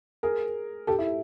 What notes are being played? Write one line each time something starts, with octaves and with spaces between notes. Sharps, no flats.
G#4 A#4
G4 A4
E4